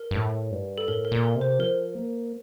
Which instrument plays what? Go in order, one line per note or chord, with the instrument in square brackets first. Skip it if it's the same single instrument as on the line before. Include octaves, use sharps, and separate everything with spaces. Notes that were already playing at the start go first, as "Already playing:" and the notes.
Already playing: [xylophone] A#4
[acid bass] G2
A2
G2
[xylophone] A4
[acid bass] A2 [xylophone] A#4
[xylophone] A#4
[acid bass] A#2
[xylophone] A#4
[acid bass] C3
[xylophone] C5
[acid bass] F3 [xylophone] A#4
[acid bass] A#3